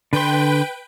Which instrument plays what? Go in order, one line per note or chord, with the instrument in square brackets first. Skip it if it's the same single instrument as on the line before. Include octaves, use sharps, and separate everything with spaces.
[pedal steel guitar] D3 C6 [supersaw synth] B4 G5